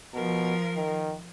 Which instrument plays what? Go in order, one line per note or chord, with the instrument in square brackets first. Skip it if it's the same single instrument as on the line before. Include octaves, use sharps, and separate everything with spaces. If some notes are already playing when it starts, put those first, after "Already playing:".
[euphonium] B2 [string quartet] F3 A#4
[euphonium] D#3